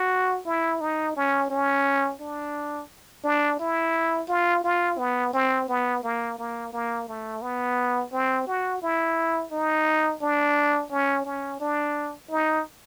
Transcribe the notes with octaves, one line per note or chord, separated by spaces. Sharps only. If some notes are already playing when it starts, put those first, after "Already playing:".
Already playing: F#4
E4
D#4
C#4
C#4
D4
D4
E4
F4
F4
B3
C4
B3
A#3
A#3
A#3
A3
B3
C4
F#4
E4
D#4
D4
C#4
C#4
D4
D#4